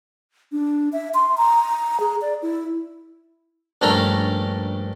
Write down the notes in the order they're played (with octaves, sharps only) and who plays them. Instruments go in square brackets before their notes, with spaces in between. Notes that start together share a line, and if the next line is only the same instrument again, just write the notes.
[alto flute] D4
E5
C6
A#5
G#4
D5
E4
[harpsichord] A#1 G2 A3 C#4 D4 A#5